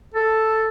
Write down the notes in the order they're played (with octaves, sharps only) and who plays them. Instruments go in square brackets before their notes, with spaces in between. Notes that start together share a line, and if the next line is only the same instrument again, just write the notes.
[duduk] A4